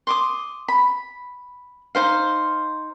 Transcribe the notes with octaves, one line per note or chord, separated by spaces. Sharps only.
C6 D6 D#6
B5
D#4 E4 C5 F5